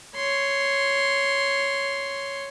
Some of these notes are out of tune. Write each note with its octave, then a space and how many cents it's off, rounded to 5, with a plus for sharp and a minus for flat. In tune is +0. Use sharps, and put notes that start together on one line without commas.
C#5 +0 C6 +0